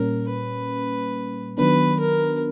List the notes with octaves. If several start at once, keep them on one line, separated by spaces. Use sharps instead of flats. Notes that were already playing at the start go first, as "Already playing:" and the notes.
Already playing: A#2 G3 A#3 C#4 A#4
B4
D#3 F#3 B3 D4 B4
A#4